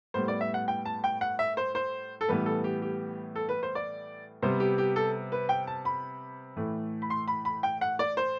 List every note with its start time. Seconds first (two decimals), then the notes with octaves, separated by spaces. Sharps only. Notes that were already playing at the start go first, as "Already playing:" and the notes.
0.14 A2 G3 B3 C5
0.28 D5
0.41 E5
0.54 F#5
0.68 G5
0.85 A5
1.04 G5
1.21 F#5
1.39 E5
1.57 C5
1.75 C5
2.21 A4
2.28 A2 E3 G3 B3 B4
2.46 A4
2.64 G4
2.82 G4
3.35 A4
3.49 B4
3.63 C5
3.75 D5
4.42 C3 G3 B3 C5
4.60 G4
4.78 G4
4.96 A4
5.32 B4
5.49 G5
5.67 A5
5.85 B5
6.57 A2 E3 A3
7.02 B5
7.10 C6
7.28 B5
7.45 B5
7.63 G5
7.81 F#5
7.99 D5
8.17 C5